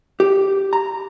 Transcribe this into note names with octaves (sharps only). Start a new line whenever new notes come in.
G4
A#5